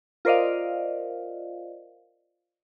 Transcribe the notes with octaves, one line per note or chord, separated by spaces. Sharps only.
F4 A#4 C5 D5 D#5 F5